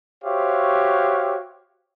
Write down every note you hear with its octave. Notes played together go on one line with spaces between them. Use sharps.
F#4 G4 C5 C#5 E5 F5